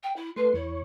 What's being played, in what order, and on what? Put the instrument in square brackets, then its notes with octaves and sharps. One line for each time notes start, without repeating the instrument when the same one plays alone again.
[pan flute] G5
E4
[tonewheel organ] A3 C6 [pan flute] B4
[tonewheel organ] E2 C#5 [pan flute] E4